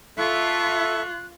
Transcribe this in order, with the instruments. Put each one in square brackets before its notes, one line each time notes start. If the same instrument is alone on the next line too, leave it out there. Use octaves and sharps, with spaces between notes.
[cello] F4 [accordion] A4 E5 [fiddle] C#6 [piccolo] F#6